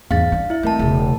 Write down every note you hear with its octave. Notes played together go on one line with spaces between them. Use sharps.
E2 G#2 F5 A6
D4
E4 E5
A3 C4 A#4 A5
E1 C#3